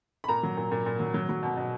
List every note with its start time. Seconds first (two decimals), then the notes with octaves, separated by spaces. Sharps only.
0.24 B5
0.28 A#2 A#5
0.43 F#3
0.57 A#2
0.71 A#2
0.86 A#2
1.00 F#3
1.14 F#3
1.29 F#3
1.43 B2
1.57 B2